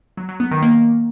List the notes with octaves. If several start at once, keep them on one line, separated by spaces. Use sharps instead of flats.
F#3
F#3
B3
D#3
A#3